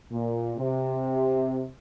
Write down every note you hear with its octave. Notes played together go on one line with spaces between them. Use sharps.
A#2
C3